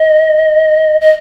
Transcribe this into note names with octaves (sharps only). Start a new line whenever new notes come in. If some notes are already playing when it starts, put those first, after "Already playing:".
Already playing: D#5
D#5